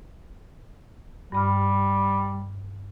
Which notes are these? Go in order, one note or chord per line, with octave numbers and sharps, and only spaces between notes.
G2 G3 B5 F6